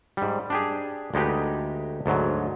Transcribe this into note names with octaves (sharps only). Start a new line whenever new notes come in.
G#2 G3
D4 G4 G#4
D2 G#3 D#4 G4 B4
D2 G#2 F#3